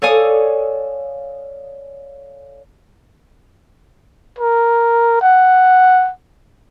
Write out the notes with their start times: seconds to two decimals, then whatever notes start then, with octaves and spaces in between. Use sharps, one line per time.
0.02 A4 C#5 D5 F5 G#5 D#6
4.38 A#4
5.21 F#5